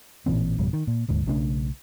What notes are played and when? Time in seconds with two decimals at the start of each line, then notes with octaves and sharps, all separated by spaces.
0.26 A1 A#2 E3 C4
0.58 G#1 F2 B2 G3
0.73 D#3
0.87 A#2
1.08 D#1 D2 G#2
1.26 B1 C#3 A3 D4